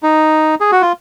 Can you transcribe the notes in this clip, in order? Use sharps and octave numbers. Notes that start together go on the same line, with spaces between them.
D#4
G#4
F#4
F4